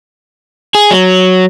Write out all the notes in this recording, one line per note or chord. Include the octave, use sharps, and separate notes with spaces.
G#4
F#3